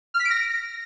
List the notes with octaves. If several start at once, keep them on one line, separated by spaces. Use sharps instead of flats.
F6
B6
D7
A#6